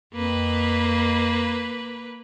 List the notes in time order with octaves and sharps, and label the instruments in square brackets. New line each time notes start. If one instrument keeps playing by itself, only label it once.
[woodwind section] F2 [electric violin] A#3 B4